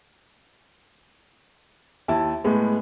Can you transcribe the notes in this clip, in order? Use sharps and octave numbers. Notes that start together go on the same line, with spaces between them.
D#2 E4 A5
A2 G#3 B3